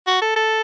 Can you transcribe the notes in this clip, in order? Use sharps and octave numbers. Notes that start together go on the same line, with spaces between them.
F#4
A4
A4